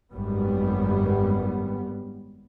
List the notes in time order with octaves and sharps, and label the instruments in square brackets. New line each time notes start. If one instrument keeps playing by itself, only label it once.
[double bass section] G#1 F#2 G3 B3